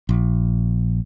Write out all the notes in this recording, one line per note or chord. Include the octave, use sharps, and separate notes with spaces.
A#1